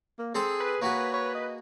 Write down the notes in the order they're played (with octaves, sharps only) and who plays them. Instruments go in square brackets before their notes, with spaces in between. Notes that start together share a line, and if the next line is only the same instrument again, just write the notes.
[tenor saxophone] A#3
[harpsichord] C4 A4 C5 [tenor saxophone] G#4
[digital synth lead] B4
[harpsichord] A#3 F#4 G#4 [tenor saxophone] C#5
[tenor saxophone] C#5
D#5